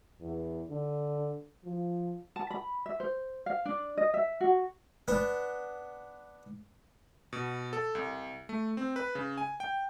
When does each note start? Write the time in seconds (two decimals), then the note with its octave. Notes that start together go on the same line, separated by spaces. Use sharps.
0.21 E2
0.69 D3
1.65 F3
2.36 A5
2.51 B5
2.86 E5
3.00 C5
3.46 F5
3.65 D4
3.97 D#5
4.14 E5
4.41 F#4
5.08 B3 D4
7.33 B2
7.73 A4
7.95 C2
8.49 A3
8.77 C4
8.96 B4
9.15 C#3
9.38 G#5
9.60 G5